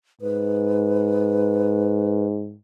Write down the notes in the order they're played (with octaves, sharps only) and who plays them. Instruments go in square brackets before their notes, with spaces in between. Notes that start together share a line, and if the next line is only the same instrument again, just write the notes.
[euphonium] G#2 [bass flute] B4